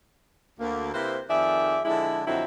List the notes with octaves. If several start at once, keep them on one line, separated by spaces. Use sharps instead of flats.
D2 A#3
C3 A#3 E4 B4 C5
F2 D#3 G#4 D5 E5
D3 F3 G#3 D4 E4
F2 D3 F#3 C4 D#4 E4